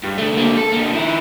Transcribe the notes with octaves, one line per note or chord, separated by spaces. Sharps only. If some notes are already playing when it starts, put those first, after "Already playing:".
G2
D3 A3
D3 A#3
A4
D3 A#3
D#3 E4